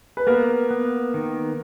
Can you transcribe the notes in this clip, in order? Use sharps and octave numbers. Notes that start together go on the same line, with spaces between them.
B4
A#3 B3 A#4
B3
D#3